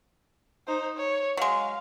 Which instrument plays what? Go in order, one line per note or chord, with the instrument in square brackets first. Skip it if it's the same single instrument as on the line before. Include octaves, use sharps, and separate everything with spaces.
[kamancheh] D#4 C5
C#5
[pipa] F#3 G#3 [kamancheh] F5